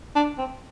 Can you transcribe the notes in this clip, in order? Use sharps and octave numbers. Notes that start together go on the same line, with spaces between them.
D4
C4